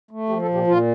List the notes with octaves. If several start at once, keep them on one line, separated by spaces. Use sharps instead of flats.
A3
F3 G4
A4
A#2
G4
A#2 F4